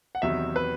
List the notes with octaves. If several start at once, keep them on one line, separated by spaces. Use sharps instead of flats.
F#5
E2 C3 D#3 F#3 E5
B4